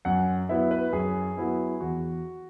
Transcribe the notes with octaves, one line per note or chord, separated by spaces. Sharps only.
F#2 F#5
F#3 B3 E4 E5
B4
F#2 G#4
F#3 B3 E4
E2 F#4